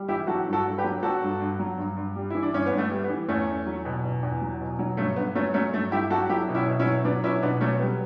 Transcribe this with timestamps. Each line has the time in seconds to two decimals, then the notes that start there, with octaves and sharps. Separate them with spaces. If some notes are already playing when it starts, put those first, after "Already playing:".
Already playing: G3
0.08 E3 E4 G4
0.27 F#3 F#4 A4
0.46 G2
0.53 F#4 A4
0.65 G2
0.78 G4 B4
0.84 F#3
1.03 F#3 F#4 A4
1.22 G2
1.40 G2
1.59 F#3
1.78 G2
1.96 G2
2.16 G3
2.30 E3 E4
2.43 D4
2.53 G2 C#4
2.66 B3
2.72 G2
2.78 A3
2.91 G3
3.04 B3
3.10 E3
3.28 E2 A3 C#4
3.47 E2
3.66 F#3
3.85 B2
4.04 E2
4.23 E2
4.42 F#3
4.61 B2
4.79 F#3
4.97 G2 A3 C#4
5.16 G2 B3
5.35 F#3 A3 C#4
5.54 F#3 A3 C#4
5.73 G2 A3
5.92 G2 E4 G4
6.10 F#3 F#4 A4
6.29 F#3 E4 G4
6.49 B2
6.55 C#4 E4
6.67 B2
6.80 C#4 E4
6.86 F#3
7.05 F#3 B3 D4
7.23 B2 C#4 E4
7.42 B2 B3 D4
7.61 F#3 A3 C#4
7.79 G3 B3